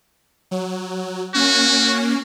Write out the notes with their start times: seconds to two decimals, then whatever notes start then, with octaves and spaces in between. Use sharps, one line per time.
0.51 F#3
1.35 A#3 C#4 F#4